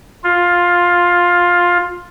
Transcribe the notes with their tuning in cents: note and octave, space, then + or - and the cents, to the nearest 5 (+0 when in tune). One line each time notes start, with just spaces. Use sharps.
F4 +10